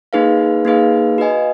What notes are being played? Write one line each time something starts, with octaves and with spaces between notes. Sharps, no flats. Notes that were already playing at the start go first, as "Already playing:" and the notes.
A#3 D#4 G#4 B4 F5
A#3 D#4 G#4 B4 F5
F#4 B4 D#5 G#5